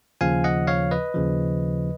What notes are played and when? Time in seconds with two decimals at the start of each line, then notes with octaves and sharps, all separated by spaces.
0.21 D#2 C#3 F3 F5 G#5
0.44 D#5 F#5
0.67 C#5 F5
0.91 B4 D#5
1.14 D#2 C#3 F3